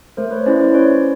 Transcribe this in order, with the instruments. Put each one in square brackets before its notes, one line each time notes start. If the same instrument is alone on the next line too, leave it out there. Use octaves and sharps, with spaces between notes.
[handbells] A3 A#4 C5
B4 C#5
C#4 E4 C5 D5
C5 D5
C#4 B4 C#5